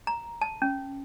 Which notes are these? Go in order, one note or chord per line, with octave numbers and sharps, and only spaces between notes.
A#5
A5
C#4